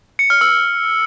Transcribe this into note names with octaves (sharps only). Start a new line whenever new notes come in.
C#7
F6
E6